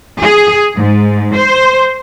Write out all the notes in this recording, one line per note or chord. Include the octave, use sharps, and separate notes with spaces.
G#4
G#2
C5